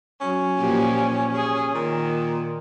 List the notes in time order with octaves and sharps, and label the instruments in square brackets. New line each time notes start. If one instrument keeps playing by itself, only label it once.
[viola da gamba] F#3 [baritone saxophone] C#4
[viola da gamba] A#2 F3 G4
G#4
[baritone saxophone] A#2 [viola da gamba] D#3